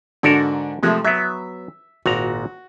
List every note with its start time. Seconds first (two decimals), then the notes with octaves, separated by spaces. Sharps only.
0.23 G#2 D3 D4 F#4 A4 A#4
0.83 C3 F3 G#3 A3
1.04 F#3 B3 E5
2.06 G#1 A#2 F#4 A#5